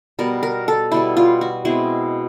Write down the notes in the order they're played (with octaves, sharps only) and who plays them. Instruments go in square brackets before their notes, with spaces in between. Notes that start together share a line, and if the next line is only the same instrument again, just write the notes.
[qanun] B2 G3 B3 A#4
A#4
A4
B2 G3 B3 E4
F4
F#4
B2 G#3 C4 E4